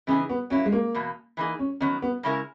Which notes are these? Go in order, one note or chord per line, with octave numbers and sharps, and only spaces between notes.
C#3 E3 B3 D#4 G#4
B3
F#3 A#3 C#4 E4
G#3
A#3
E2 B2 A#3
E3 A#3 D#4 G#4
C#4
D#3 F#3 B3 C#4
B3
C#3 G#3 C#4 E4 A#4